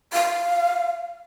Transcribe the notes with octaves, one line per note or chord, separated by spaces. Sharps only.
F5